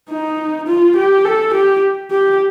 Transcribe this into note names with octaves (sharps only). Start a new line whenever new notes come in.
D#4
F4
G4
A4
G4
G4